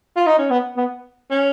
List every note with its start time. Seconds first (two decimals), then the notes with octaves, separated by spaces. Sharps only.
0.16 F4
0.27 D#4
0.39 C#4
0.50 B3
0.77 B3
1.31 C#4